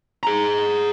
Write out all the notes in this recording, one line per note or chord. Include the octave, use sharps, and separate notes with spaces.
G#4 A#5